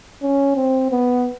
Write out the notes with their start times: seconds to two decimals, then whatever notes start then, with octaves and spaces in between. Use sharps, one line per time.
0.23 C#4
0.56 C4
0.91 B3